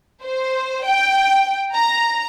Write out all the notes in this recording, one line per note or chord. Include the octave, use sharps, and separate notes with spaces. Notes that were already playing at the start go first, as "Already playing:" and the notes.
C5
G5
A#5